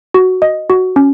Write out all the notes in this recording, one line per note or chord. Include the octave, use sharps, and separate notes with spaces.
F#4
D#5
F#4
C#4